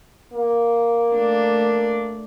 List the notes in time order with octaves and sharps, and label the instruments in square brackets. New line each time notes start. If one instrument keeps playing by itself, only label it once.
[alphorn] A#3
[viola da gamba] A3 D4